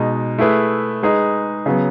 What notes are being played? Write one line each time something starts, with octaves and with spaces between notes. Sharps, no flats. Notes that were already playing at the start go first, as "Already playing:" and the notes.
Already playing: B2 G#3 D#4
A3 E4 G#4 B4
G#3 D#4 G#4 B4
C#3 F#3 B3